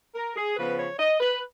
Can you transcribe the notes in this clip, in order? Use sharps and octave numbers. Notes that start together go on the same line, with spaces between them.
A#4
G#4
C#3 F3 B3 B4
C#5
D#5
B4